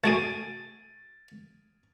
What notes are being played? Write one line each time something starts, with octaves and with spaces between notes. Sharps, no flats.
A3 F#4 G#4 A6 D7 D#7